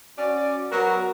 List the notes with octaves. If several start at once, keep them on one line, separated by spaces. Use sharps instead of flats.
C#4 F#4 D5
F#3 B3 F#4 A#4